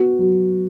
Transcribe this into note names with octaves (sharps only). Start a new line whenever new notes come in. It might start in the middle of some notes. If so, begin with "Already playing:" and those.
Already playing: B3 F#4
F#3